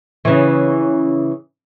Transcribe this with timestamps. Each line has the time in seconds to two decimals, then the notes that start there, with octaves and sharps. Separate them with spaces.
0.25 C#3 E3